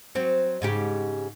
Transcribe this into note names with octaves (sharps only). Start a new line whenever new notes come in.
F#3 C4
G#2 C#3 G4